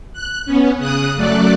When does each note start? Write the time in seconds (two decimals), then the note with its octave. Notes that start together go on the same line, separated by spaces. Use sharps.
0.13 F#6
0.46 B3 C#4
0.79 C#3 D#6 F#6
1.16 F#2 F#3 A3 D5 F#6